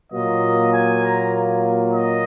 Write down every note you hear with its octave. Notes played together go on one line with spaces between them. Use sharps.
A#2 F#3 A#3 F4 D#5
G#5
A#5
D#5